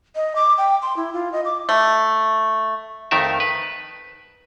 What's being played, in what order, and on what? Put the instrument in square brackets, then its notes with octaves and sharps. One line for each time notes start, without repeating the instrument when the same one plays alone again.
[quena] D#5
D6
G5
C6
E4
F4
D#5
D6
[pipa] A3
[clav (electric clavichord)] F2 D#3 A3 A#4 E5
B4